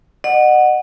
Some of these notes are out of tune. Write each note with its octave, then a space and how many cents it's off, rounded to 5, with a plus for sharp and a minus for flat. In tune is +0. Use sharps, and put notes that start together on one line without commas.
D#5 -40 F#5 +0